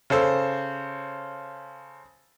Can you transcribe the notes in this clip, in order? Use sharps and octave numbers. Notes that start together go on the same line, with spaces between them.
C#3 A4 C5 E6